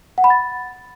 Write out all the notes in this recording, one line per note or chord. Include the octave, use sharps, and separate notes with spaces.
F#5
B5
A6